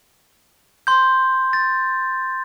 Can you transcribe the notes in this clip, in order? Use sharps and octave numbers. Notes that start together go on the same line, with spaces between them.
C6 G6
A6